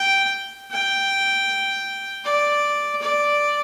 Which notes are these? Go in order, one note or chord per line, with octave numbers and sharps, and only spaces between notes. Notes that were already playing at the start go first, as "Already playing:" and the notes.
Already playing: G5
G5
D5
D5